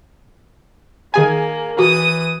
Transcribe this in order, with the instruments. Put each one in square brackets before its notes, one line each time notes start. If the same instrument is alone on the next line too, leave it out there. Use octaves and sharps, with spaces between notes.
[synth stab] D#3 G#4 G#5 [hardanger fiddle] A#3
[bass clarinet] E3 [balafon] F#4 [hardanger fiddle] D#6